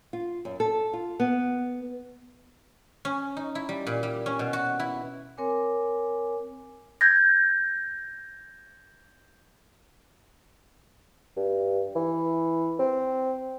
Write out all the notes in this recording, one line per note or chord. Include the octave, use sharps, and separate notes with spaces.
F4
F#2
A4
F4
B3
C#4
D#4
E4
G3
A#2
G3
C#4
B2
F#4
E4
C4 A#4 C#5 G#5 D6
G6 G#6 A#6
G2
E3
C4